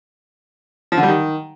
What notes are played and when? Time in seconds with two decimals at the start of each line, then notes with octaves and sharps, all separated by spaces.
0.92 F3
0.97 D3
1.03 G3
1.08 D#3